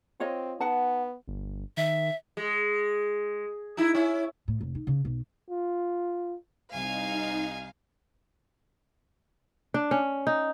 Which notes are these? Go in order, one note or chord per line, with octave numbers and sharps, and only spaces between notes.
C4 F4 C#5 D#5
B3 D#4 F#5 A5
G1
D#3 E5
G#3
D#4 E4
C#4 E4
A2
F1
D#4
C#3
B1
F4
C2 D#4 F5 G#5
D4
C#4
D#4